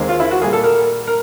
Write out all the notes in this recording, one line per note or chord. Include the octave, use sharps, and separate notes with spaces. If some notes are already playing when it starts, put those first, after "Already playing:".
Already playing: D#2 D#3 G#3 C4
F4
E4
F#4
A#2 G3 A#3 G#4
A4
A#4
A#4